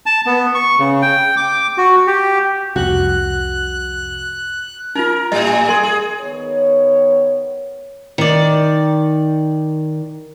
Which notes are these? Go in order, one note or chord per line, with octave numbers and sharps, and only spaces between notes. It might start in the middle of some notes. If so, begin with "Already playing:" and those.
A5
B3
C#6
C#3
G5
D6
F#4
G4
C2 F2 F#4 F#6
D#4 F4 A#4
A2 G3 D#5
G#5
G#4 A#4 G#5 C6
G#4
D#3 B3 C#5
D#3 D5